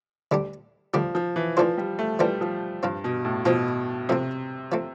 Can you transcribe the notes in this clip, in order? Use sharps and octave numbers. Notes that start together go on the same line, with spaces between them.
D2 D3 G3 D4 G4
D2 D3 F3 G3 D4 G4
F3
E3
E3 F3 A3 D4 F4 C5
G3
A3
E3 G3 A3 D4 F4 C5
F3
G2 F3 C4 F4
B2
A2
B2 F3 C4 F4
C3 F3 A3 C4
F3 A3 C4